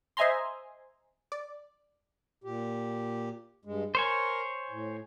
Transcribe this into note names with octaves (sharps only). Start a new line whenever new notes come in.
C5 D#5 E5 G#5 A#5 C6
D5
A#2 G4
G2 G#3
A#4 C5 C#5 G#5
A2